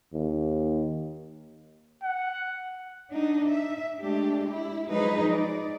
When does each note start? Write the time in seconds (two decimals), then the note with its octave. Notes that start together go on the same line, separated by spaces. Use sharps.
0.13 D#2
2.03 F#5
3.11 D4 D#4
3.48 E5
4.01 G#3 A3 D4 G4
4.49 E4
4.88 F3 F#3 G#3 D#4 G#4 B4
5.33 D5